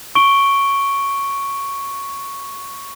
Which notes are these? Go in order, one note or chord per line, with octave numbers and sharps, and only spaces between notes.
C#6 D7 G7